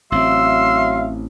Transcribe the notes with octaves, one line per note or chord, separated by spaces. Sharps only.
A1 F#3 C4 E5 F5 C6 E6